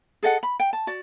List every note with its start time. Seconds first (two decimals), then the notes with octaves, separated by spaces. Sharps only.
0.23 G#4 A4 D#5 F#5
0.43 B5
0.60 G5
0.73 A5
0.87 F#4 D5